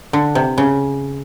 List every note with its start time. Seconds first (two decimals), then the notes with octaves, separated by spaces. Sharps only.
0.13 D3
0.35 C3
0.58 C#3